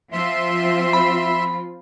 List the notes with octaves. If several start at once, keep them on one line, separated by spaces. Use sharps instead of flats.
F3 C4 F4 E5 C6
B5